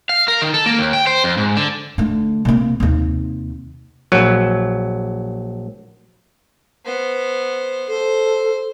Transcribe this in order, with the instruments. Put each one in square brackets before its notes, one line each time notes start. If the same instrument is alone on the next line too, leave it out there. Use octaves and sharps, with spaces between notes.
[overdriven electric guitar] F5
A#4
D#3
A4
A#3
D#2
G5
C5
F2
G#2
D3
[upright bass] D3 A3
C3 A#3
D#2 C3
[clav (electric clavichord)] A#1 F#3
[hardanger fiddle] B3 C5
[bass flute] A4 [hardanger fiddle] C5